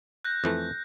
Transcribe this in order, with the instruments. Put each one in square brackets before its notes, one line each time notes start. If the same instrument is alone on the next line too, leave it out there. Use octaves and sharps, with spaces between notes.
[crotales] F#6 G6 A#6
[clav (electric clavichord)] F2 E3 A3